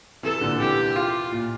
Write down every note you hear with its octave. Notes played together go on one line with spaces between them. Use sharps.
C3 E3 A4
A#2 D3
C3 E3 G4
F4
A#2